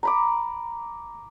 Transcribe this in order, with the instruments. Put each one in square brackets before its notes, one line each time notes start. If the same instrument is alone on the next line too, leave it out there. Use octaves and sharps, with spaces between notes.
[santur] A#5 B5 D6